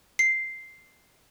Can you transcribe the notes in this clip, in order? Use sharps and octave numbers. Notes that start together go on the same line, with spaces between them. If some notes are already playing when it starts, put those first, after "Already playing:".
C7